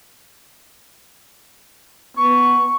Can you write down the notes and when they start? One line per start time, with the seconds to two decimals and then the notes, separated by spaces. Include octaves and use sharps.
2.17 B3 C#6